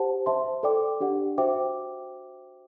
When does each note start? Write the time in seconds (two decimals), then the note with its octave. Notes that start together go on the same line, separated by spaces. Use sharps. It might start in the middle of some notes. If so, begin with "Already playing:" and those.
Already playing: G4 C5 F#5 A5
0.26 C5 E5 A5 C6
0.63 A4 D5 G5 D6
1.00 D4 G4 D5 F#5
1.38 F#4 C5 E5 G5 D6